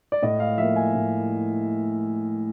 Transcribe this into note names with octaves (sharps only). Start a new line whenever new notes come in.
D5
A2 D#5
F5
F3 A#3 E5
G#5
A2